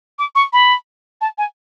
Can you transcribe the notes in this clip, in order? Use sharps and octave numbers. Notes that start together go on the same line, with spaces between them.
D6
C#6
B5
A5
G#5